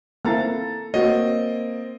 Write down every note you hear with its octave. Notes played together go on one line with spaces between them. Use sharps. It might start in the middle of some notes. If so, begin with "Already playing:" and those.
A#3 C4 E4 A4 A#5 A6
A#3 C4 F#4 C#5 D#5